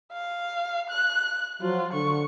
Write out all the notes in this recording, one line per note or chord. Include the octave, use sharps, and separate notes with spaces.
F5
F#6
F3 F#3 F4
D3 C#6